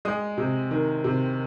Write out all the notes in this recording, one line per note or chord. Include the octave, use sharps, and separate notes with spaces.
G#3 D#6
C3
D#3
C3